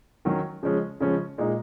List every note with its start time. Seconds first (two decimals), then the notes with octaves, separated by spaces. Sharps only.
0.25 D#3 F#3 C#4
0.63 C#3 F3 G#3 C#4
1.00 C#3 F3 G#3 C#4
1.38 A#2 G#3 D#4